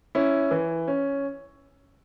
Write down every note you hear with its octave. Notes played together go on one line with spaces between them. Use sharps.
C#4 E4
E3
C#4